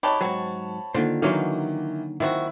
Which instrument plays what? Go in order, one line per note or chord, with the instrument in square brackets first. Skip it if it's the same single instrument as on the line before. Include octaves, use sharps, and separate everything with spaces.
[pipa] F#3 D#4 G4 [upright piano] C#5 A5 B5
[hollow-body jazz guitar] G#2 F#3 [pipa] C4 F#4
[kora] D3 D#3 [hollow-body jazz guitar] A#3 F4 C5
[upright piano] D#3 E3 [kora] F#3 A#3 F5 [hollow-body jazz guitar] D#4 C#5 C6
[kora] D#3 [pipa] F3 C4 F#4 [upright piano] E4